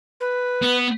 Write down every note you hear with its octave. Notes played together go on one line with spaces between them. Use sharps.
B4
B3